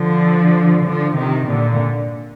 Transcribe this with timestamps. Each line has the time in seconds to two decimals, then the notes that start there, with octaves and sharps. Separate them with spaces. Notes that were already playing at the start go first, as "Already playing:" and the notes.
Already playing: D3 F3
0.84 D3 F3
1.17 C3 D#3
1.49 A#2 D3